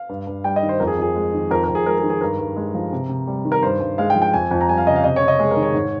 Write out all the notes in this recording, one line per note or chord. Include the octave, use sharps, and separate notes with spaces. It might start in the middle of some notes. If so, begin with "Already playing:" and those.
Already playing: F5
G2
G2
G3 G5
D#5
D#3
C5
F2 A#4
G#4
F2 G#4
G#3
D#3
F2 A#4
A#4
F2
G#4
G#3 A#4
G#4
D#3
G#4
G2 A#4
G2
G#3
F3
C3
C3
G3
D#3
A#4
G2 C5
G2
G#3 F5
G5
F3
G5
F2 G#5
F2
A#5
G3 G#5
F5
C#3 D#5
F5
C3 D#5
C#5
C3
D#5
G#3 G#4
A#4
D#3
C#5
G#2